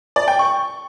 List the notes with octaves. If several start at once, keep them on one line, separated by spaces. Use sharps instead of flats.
D5
G5
C#6